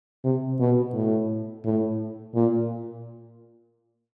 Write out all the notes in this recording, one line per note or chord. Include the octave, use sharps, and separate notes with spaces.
C3
B2
A2
A2
A#2